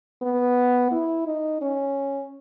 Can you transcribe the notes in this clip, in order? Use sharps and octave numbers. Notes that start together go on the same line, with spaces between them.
B3
E4
D#4
C#4